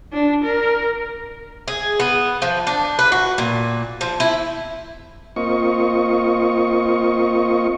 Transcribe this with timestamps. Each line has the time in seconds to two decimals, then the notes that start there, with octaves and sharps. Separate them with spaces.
0.13 D4
0.44 A#4
1.68 G#4
1.99 B3
2.42 F3
2.67 D4
2.99 B4
3.12 F#4
3.38 A#2
4.01 F3
4.20 E4
5.36 A#3 C4 F4 D#5 C#6